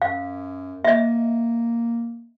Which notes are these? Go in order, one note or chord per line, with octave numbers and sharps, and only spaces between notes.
F#2 F5
A#3 D#5 E5